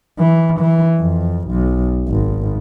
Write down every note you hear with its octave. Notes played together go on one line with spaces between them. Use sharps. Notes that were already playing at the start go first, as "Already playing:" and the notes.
E3
E3
F2
B1
G#1